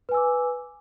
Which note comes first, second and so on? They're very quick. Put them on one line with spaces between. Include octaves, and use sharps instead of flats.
B4 G#5 E6 D6